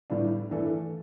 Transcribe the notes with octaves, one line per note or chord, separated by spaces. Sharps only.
A2 G3 B3 D4
G2 E3 A3 D4 A4